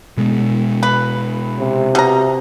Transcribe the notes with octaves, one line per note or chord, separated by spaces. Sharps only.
B2 G#3 B3
B4
C3
B2 A#5